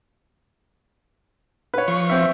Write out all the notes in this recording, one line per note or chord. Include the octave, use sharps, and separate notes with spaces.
B4 C#5
F3 C#6
C4 E5